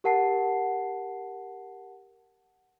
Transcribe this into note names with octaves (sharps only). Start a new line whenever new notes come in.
G4 A#4 F#5 A5 C7